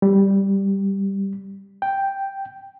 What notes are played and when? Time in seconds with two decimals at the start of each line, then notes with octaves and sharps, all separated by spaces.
0.02 G3
1.82 G5